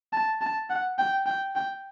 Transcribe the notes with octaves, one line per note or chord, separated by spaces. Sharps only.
A5
A5
F#5
G5
G5
G5